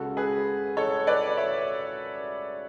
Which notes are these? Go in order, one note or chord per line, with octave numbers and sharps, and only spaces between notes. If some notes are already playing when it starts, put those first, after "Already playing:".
Already playing: C#2 C#3 G#3 F#4 A4
G#4 B4
A4 C#5
B4 D5
C#5 E5